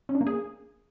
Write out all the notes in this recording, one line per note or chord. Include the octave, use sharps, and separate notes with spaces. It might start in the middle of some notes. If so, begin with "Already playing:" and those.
C#4
D4
A#3
G#4